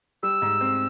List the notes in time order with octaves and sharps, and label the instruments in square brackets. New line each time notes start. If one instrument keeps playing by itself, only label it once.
[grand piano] G3 [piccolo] E6
[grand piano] G#2
C4